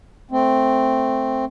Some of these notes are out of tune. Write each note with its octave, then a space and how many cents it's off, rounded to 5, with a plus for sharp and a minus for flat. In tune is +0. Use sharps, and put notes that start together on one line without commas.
A3 +0 C4 +0